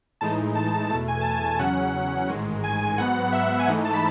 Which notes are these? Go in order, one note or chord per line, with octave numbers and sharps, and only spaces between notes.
A2 E3 G#3 D#4 A5
A5
A5
E2 B2 A3 A5
G#5
A5
G#5
E2 C#3 F#3 C#4 F#5
A1 G#2 D#3 G#3
G#5
G#5
G#2 F#3 B3 F#5
E5
G#5
G#2 E3 A3 D#4 F#5
A5
B5